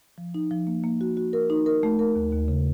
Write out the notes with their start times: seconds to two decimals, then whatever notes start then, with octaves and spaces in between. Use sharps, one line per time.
0.18 F3
0.34 D#4
0.51 F3
0.67 A#3
0.84 A#3
1.01 F#4
1.17 F#4
1.33 A#4
1.50 D#4
1.66 A#4
1.83 A3
1.99 A#4
2.16 D#2
2.32 D#2
2.48 C#3